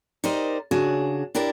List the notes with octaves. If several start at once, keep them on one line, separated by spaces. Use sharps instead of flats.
D#4 G4 A#4 C5 D5 D#5
C#3 D4 F#4 G#4
D4 E4 G4 A#4 D5 A5